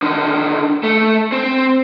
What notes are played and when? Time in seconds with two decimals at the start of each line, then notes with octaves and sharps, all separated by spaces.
0.03 D3 D#3
0.83 A3
1.32 C4